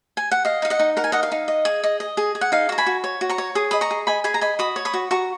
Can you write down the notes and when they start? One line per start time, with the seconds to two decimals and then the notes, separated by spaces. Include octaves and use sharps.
0.17 G#5
0.31 F#5
0.45 D#5 F5
0.62 D#4 F5
0.70 D#5 F#5
0.79 D#4
0.97 A#4 F#5
1.04 G#5
1.12 D#4 D#5 F#5
1.23 F5
1.32 D#4
1.48 D#5
1.65 G#4
1.84 D#5
2.00 D#5
2.17 G#4
2.35 G#4
2.41 F#5
2.52 D#4 F5
2.69 F#4 A#5
2.78 G#5 B5
2.86 F#4
3.04 C#5
3.21 F#4
3.29 A#5 C#6
3.38 C#5
3.55 G#4 D#6
3.71 D#5 B5 D#6
3.81 A#5 C#6
3.91 G#4
4.07 D#5 G#5 B5
4.24 G#4 G#5 B5
4.34 A#5
4.41 D#5 G#5 B5
4.59 F#4 B5 D#6
4.76 C#5
4.85 B5 D#6
4.93 F#4
5.11 F#4 A#5 C#6